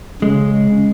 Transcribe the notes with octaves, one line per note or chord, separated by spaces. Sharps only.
C#3 G#3